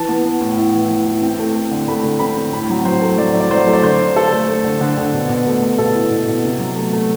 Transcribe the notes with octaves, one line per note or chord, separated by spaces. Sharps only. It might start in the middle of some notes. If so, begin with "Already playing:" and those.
Already playing: E3 A5
B3
B3
A2
E4
E3
E3
E3
C4
A3
A3
D3
A3 B5
D3
C4 B5
C4
A2 B5
F#3
F#3 C5
A3
F#3 D5
E4
D5
F#3 C5
A3
D5
D3 C5
D4
D4 A4
A3
A3
D3
D3
D3
B2
B2
A3
A3
B2 A4
E4
B2
B2
C3
F#3
A3
A3